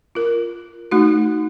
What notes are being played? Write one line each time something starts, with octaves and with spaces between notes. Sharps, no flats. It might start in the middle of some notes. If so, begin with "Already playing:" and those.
F4 A#4
A3 D#4 F#4